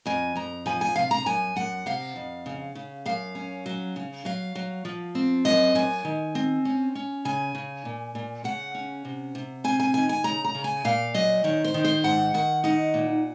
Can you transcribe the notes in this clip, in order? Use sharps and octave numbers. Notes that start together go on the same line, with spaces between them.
F2 G#5
F2 A#5
F3 G#5
G#5
C3 F5
A#5
F#2 G#5
F#2 F#5
C3 F5
F2
C#3
C#3
F#2 F5
C#4
F#3
C#3
F#3 F5
F#3
F3
C4
F#2 D#5
F#2 G#5
D#3
C4
C#4
C#4
C#3 G#5
C#3
A#2
A#2
C#3 F#5
C#4
C3
C3
C4 G#5
G#5
D#3 G#5
G#5
C#3 A#5
A#5
C#3
G#5
A#2 F5
F#3 D#5
D#3 C#5
C5
D#3
C5
G#2 F#5
D#3 F#5
D#4 F#5
A#2